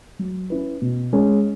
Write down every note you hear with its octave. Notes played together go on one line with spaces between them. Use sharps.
F#3
C#4 E4 B4
B2
G#3 C#4 G#4